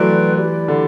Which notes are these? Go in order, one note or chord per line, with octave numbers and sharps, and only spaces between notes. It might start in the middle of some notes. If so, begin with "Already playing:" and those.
Already playing: E3 F#3 A3 B4 D5 G5 C6
E4 G4 D5
D3